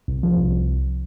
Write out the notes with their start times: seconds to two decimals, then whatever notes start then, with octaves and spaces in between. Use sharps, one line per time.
0.08 C2
0.23 F3
0.38 C2